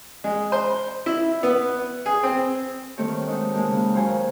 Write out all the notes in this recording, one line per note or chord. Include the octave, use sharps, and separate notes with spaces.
G#3
C5
E4
B3
G#4
C4
D#3 G3 A3 C4 G4 C#5
G#3 D#4 A4 F#5
G#3 A#3 G4 A5
C#3
D#2 F#3 C5 F5 G#5 A#5